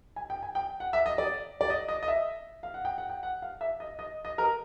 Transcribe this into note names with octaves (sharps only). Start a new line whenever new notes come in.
G#5
G5
G#5
G5
F#5
E5
D#5
D5
D5
D#5
D#5
D#5
E5
F5
F#5
G5
F#5
G5
F#5
F5
E5
D#5
D#5
D#5
A#4